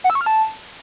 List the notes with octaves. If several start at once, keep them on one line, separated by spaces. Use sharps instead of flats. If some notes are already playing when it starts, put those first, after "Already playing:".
F#5
E6
C#6
F6
A5